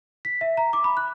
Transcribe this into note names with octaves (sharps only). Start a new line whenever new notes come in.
B6
E5
A#5
D6
B5
F#6